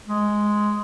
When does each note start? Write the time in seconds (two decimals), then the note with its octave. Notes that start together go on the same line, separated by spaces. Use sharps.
0.08 G#3